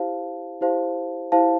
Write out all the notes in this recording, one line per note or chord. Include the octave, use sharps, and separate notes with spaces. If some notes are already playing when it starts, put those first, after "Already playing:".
Already playing: E4 G4 C5 F5 A5
E4 G4 C5 F5 A5
E4 G4 C5 F5 A5